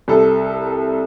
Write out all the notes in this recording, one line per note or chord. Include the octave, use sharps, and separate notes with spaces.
C2 A4